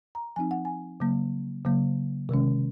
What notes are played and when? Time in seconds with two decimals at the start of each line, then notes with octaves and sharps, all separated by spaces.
0.15 A#5
0.36 F3 C4 D#4 G#5
0.51 F#5
0.65 G#5
1.00 C#3 F#3 A#3
1.65 C#3 F#3 A#3
2.29 C3 D#3 G#3 C#4